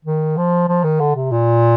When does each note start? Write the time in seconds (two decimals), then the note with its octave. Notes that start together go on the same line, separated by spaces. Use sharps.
0.05 D#3
0.37 F3
0.68 F3
0.84 D#3
1.00 D3
1.15 C3
1.31 A#2